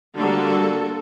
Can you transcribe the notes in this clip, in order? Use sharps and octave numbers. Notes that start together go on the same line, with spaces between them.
D3 G3 A#3 F#4 A4